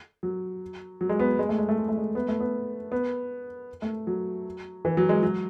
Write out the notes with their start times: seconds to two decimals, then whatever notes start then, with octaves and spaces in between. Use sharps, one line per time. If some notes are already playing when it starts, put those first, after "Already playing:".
0.23 F#3
1.01 F#3
1.09 G#3
1.20 B3
1.39 G#3
1.49 A3
1.58 G#3
1.69 A3
1.78 G#3
1.89 A3
1.97 G#3
2.15 B3
2.28 A3
2.40 B3
2.92 B3
3.82 A3
4.07 F#3
4.85 E3
4.97 F#3
5.09 G#3
5.23 F#3